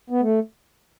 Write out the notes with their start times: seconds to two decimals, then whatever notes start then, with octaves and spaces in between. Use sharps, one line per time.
0.10 B3
0.21 A3